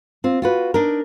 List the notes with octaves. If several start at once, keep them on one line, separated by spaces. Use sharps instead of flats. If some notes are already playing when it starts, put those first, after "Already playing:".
C4 F4
F4 F#4 B4
D4 D#4 A#4